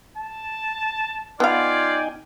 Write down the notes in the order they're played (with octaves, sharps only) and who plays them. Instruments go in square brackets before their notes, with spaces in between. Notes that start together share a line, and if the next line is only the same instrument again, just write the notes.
[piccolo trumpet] A5
[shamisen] B3 F5 [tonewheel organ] D#4 G5 G#5 [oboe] F4 [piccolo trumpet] D5